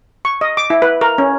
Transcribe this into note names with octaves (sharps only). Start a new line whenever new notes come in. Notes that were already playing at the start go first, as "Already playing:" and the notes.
C#6
D#5
D6
E4
B4
A#4
C#4